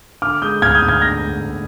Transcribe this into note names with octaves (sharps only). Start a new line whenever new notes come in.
D3 D6 F6
G#3 D#6 G6
D2 F6 G#6
D#6 G6
D2
F6 G#6
D3 G6 A#6
G#3
D2